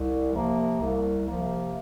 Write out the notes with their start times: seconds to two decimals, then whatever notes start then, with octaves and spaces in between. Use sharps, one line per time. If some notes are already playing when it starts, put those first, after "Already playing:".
Already playing: C2
0.34 C3 F3 A#3
0.81 C2
1.27 C3 F3 A#3